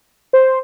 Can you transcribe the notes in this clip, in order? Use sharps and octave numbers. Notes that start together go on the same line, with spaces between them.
C5